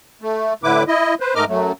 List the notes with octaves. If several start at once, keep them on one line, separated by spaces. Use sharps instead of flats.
A3
A2 D3 E4 B4 D6
E4 D#5
B4 C5
G#2 A3 A#4 D#5 D6 F6
F#2 F#3 A3